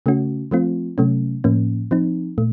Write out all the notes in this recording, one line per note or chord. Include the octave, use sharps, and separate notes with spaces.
C#3 A3 C#4 F#4
F3 A3 C4 F4
C3 F#3 A3 C#4
A2 F3 A#3 C#4
F3 C4 D#4
A#2 A3